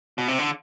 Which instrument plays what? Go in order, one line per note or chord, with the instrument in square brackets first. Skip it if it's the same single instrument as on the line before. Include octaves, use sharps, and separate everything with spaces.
[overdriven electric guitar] B2
C3
D3